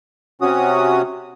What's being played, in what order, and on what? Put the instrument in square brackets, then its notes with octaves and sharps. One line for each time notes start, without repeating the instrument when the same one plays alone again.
[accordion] C3 C#4 F#4 D#6